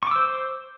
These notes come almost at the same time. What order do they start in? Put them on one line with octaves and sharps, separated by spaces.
C#6 D6 E6 C5